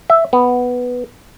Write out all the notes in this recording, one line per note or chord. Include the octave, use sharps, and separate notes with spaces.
E5
B3